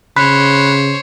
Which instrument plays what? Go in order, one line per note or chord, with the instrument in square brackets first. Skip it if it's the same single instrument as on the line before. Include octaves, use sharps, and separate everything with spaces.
[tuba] C#3 [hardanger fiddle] C5 C#5 [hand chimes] B5 F#6 B6